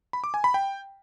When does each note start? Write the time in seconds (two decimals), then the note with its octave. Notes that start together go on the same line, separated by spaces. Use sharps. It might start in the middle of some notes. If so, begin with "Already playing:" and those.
0.13 B5
0.24 D6
0.34 G#5
0.44 B5
0.54 G5